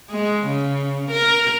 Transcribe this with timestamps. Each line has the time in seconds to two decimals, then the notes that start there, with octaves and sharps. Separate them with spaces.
0.11 G#3
0.47 C#3
1.11 A#4